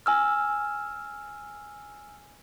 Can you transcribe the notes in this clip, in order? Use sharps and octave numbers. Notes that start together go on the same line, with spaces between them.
G#5 E6 F6